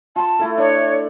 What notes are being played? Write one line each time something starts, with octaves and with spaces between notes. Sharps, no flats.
F4 A5 C6
A3 E4 A4
D4 C#5